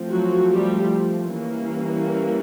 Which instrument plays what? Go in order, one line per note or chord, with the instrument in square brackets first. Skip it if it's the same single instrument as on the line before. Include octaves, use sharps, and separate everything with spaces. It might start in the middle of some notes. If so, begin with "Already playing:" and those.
Already playing: [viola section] F3 A3 C4
F#3 F#4
G3 G4
E3 G3 A#3 C#4